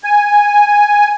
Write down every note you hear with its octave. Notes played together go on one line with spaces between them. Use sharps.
G#5